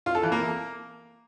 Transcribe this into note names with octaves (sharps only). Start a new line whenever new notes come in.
F4
A4
E3
A#3